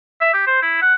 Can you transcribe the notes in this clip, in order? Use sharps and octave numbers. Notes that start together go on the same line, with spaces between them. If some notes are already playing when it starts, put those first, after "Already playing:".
E5
G4
C5
E4
F#5